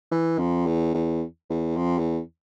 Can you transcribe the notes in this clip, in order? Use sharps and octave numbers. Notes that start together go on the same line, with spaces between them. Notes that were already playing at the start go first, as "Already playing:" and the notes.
E3
F2
E2
E2
E2
F2
E2